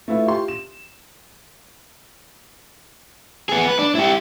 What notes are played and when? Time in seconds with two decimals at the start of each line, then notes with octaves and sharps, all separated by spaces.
0.08 A3 E4 F4 B4
0.26 F4 G4 C6
0.48 E7
3.49 B3 G#4
3.67 B4
3.79 D4
3.95 E4 G4